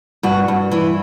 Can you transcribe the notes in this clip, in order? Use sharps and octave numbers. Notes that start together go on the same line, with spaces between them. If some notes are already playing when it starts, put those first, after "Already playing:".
G2 F#4
G2
E3 E4